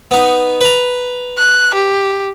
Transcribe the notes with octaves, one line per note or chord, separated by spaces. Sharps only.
B3 D#4
B4 A#5
F#6
G4